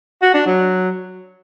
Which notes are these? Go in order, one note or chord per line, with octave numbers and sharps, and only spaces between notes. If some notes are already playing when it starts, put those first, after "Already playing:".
F#4
D4
F#3